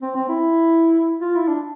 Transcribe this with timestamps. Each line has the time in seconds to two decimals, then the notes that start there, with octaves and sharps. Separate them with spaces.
0.02 C4
0.15 C4
0.29 E4
1.21 F4
1.35 E4
1.48 D4